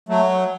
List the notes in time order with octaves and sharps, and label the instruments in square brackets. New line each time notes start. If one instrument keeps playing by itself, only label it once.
[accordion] F#3 A3